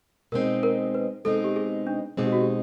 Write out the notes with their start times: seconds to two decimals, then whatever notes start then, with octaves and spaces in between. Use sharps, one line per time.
0.32 B2 G#3 C4 D#4 A#4
0.63 A#4
0.94 B4
1.25 B2 G#3 C4 D#4 A4
1.44 G4
1.56 G#4
1.87 D4
2.17 B2 G#3 C4 D#4 G#4
2.25 G4
2.32 F#4
2.40 G4